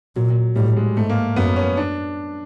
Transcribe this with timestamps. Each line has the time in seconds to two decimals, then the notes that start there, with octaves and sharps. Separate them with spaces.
0.16 A#2 F#3
0.56 A2 G3
0.77 G#3
0.96 G#2 A3
1.10 A#3
1.36 F#2 B3
1.56 C#4
1.77 D4